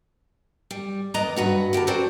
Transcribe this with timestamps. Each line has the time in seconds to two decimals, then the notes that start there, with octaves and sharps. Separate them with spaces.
0.71 G3
1.14 D#2 B4 D5 D#5 A#5
1.36 G2 F#4 B4
1.73 E4 G4 A#4 A5
1.87 C4 F#4 A#4 C5 D5